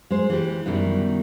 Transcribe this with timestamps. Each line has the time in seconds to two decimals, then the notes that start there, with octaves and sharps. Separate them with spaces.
0.11 G#3 C5
0.30 E3 G4
0.66 F#2 B2 D#3 G3 E4